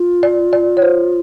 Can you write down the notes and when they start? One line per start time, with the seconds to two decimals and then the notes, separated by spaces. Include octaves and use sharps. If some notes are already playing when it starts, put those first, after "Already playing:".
Already playing: F4
0.23 D5
0.53 D5
0.77 C#5
0.82 C5